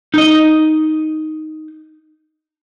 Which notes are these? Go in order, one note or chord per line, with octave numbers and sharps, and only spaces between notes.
D#4 D#5